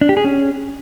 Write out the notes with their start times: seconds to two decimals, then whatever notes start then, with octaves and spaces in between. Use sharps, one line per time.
0.01 D4
0.09 G4
0.17 G#4
0.24 C#4